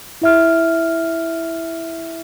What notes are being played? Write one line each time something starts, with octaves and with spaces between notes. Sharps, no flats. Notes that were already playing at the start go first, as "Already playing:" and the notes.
E4 E5 F6